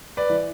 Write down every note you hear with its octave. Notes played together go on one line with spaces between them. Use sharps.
B4 D5
E3